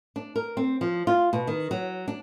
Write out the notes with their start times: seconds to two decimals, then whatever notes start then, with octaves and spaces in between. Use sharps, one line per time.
0.16 D4
0.36 A#4
0.57 C4
0.81 F3
1.07 F4
1.33 B2
1.47 D#3
1.71 F#3
2.08 D4